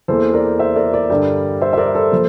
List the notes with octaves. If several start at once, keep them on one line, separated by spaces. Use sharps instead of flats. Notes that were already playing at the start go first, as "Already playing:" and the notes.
E2 E3 A#3 A4 C5
A#4 D5
C5 E5
A#4 D5
A#4 D5
G2 D3 G3
C5 E5
E5
A#4 D5
A4 C5
F3 A#3